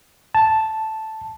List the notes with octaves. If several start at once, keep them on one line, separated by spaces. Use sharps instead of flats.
A5